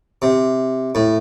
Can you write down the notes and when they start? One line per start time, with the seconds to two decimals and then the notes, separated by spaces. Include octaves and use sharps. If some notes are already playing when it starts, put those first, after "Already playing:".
0.22 C3
0.95 A2